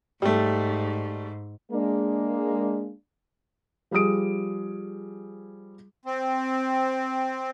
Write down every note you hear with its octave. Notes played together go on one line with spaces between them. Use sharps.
G#2 G3 A3
G#3 A#3 D4
F3 G3 G#4 D#6 D7
C4